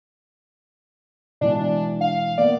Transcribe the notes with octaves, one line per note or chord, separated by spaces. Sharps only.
B2 E3 G#3 D4
F5
A#3 B3 D5